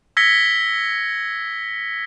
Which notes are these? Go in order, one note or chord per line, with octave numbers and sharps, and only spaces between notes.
E6 G#6 A#6 B6 C#7 G7